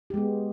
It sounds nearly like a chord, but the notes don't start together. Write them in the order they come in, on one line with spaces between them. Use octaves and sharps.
G4 G#3 B3